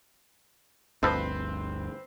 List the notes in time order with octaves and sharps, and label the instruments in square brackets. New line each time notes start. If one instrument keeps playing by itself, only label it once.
[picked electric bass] G1 D2 [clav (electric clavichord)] F3 A4 D#5 [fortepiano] C4 B4 C5